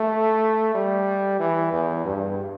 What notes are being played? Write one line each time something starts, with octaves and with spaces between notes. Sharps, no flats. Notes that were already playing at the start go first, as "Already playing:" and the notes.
Already playing: A3
G3
E3
E2
G2